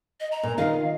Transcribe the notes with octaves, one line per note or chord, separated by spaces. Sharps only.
D#5
A#5
A#2
D#3 F4 D#5 F5